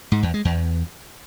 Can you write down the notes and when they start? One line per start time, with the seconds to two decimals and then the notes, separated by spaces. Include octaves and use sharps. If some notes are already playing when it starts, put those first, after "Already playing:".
0.12 G#2
0.23 E2
0.34 G#3
0.45 E2